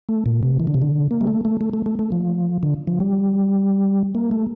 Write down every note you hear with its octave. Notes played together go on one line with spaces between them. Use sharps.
A3
A#2
C3
E3
D3
C3
D3
A#3
G3
A3
A3
A3
A3
A3
A3
F3
D3
F3
G3
A#3
A3